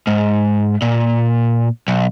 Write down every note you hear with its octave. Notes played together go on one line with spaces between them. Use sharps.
G#2
A#2
B1